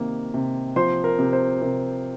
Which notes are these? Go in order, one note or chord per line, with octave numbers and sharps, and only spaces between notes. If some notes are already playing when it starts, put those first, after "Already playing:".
Already playing: C3 D#3 A#3
C3
F3 C5 C6
A#4
C3
C5
C3 A#4